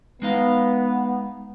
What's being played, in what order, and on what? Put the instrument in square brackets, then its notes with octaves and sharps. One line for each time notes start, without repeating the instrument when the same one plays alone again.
[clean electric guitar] G#3 D#4 F5 [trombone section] B3